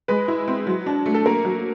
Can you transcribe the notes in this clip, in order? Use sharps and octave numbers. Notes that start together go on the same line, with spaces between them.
G#3 B4
E4
C4
F#3
D4
A3
A4
A#3 A#4
F#3